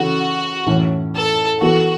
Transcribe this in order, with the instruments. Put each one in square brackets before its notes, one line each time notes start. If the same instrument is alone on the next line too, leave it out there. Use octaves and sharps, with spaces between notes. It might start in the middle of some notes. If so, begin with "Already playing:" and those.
Already playing: [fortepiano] C#3 E3 C#4 A4 [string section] F#4
[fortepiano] A2 E3 C#4 E4
[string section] A4
[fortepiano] E3 B3 A4 [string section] F#4